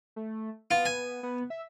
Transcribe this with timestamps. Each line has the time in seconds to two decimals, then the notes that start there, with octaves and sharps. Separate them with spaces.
0.16 A3
0.71 B3 F4
0.85 G#5
1.23 B3
1.50 E5